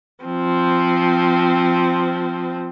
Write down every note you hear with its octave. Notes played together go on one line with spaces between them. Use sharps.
F3 C4